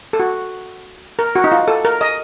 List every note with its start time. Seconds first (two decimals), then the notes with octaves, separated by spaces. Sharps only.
0.13 A4
0.20 F#4
1.19 A#4
1.36 F#4
1.44 D#4
1.52 F4
1.68 A4
1.85 A#4
2.01 D#5